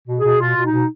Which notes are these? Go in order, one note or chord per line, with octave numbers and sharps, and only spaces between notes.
B2
G#4
B2
B2 F4
B2
D#4
B2